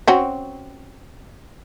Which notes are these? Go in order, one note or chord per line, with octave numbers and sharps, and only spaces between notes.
C4 C#4 F#4